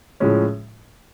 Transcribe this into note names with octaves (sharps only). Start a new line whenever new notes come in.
A2 F3 G#3 C#4